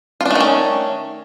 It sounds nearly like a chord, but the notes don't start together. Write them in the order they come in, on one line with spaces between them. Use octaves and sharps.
F4 D4 A3 D#3 C#4